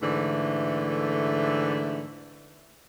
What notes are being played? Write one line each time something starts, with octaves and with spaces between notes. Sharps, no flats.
G#2 D3 E3 A3